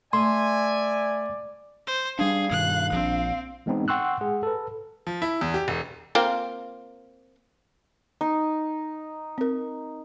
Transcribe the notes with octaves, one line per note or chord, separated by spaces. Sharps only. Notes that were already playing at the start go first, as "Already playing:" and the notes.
A3 D5 E5 G#5 C6
C5
G3 D4 G#4 F5
G2 B2 D#3 F#6
A#1 F3 C4 D4
E3 G#3 B3 C4 D#4
F#5 G5 C6 C#6 E6 F#6
G#3 G#4 F#5
A4 B4
F3
E4
E2
G4
E1
A#3 C4 F4
D#4
C4 A#4